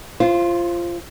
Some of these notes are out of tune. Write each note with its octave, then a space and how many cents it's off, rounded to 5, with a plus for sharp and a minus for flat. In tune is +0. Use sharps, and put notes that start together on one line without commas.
F4 -20 C5 +15